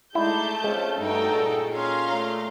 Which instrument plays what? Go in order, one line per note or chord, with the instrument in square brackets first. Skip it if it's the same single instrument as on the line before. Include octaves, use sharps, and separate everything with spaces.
[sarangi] G#3 [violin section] A3 A5 G6 [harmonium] D#4 D5 [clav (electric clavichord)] E4
[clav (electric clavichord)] G#3 [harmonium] C4 F4 [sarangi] C#4
[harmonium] G2 G3 A3 [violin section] D#4 F#4 G5 [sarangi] A4
[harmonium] A#2 G#4
[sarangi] C#4 [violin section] F5 A#5 C6
[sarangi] A3